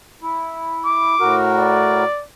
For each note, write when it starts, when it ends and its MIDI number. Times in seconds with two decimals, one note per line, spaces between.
0.22 1.15 64
0.86 1.38 86
1.20 2.04 45
1.20 2.04 66
1.20 2.04 70
1.58 2.24 74